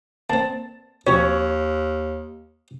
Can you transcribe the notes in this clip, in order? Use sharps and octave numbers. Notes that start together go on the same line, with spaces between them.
A#3 C4 A5
D#2 F3 F#3 C4 C#5